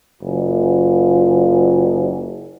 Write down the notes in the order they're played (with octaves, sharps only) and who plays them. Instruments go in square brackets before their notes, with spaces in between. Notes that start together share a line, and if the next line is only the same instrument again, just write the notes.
[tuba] F#1 [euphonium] F4